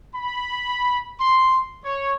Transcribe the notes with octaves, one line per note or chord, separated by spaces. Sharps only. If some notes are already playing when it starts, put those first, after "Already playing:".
B5
C6
C#5